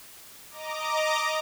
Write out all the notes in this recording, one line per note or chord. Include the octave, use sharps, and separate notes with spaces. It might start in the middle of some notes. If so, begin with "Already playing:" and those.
D#5 A#5 D6